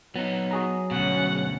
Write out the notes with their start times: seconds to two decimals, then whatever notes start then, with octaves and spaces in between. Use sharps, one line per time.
0.16 F#3 B3 D#4
0.51 F#4 G#4 A#5
0.91 D2 B2 C#4 F#5